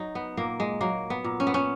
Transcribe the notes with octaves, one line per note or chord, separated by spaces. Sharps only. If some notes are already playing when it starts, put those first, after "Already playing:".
Already playing: F#3 D#4
B3
A#2 A#3
G#3
F#3 A#3
B3
A#2
C#4
B3
C#4